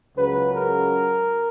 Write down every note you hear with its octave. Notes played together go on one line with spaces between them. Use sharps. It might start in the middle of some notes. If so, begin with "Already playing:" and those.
C#2 C#3 F#3 B4
A#4